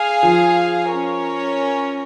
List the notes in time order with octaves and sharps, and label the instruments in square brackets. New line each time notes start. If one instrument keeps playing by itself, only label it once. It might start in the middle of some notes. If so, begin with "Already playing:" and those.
Already playing: [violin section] G#4 F5 G#5
[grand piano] F3
[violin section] C#4 A#4 C#5